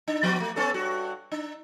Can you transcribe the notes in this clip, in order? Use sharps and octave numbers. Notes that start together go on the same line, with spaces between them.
D4
F3 B3 F#4
A3
B3 C#4 A4
G2 F#4
D4